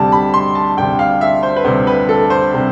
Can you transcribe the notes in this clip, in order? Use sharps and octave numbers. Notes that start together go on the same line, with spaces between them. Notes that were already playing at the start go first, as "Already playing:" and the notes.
Already playing: D2 C3 G3 A5
B5
C6
A5
D2 C3 G3 G5
F5
E5
C5
B4
D2 C3 G3 C5
B4
A4
C5
C3 G3